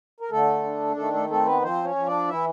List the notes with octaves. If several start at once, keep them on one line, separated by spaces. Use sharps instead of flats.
A#4
D3 A3 A4
D4
D#3 A3 A4
A3 A4
A3 C4 A4
B3 B4
F3 C4 C5
C#4 C#5
F3
D4 D5
E3 E4 E5